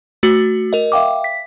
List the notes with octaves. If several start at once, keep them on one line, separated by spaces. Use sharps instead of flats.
A3 F#4
A#4 D#5
E5 F5 G5 D6
B6